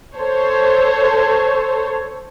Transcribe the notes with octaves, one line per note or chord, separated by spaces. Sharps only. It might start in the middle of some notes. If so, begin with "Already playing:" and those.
A4 C5 C#5